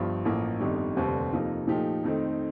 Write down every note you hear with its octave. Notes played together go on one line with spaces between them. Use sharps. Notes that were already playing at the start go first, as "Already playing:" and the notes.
Already playing: G1 G2 F3
A1 A2 F3 A#3
G1 F2 D#3 G3
F1 D#2 D3 G3 C4
F2 C3 F3 A#3 D#4
A#2 F3 A3 D#4 G4
F2 D#3 A3 C4 D#4